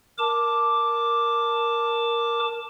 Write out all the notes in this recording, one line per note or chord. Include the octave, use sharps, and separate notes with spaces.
A#4 A5 D6